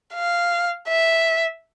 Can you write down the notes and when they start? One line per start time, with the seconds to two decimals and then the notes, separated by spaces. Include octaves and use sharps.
0.14 F5
0.89 E5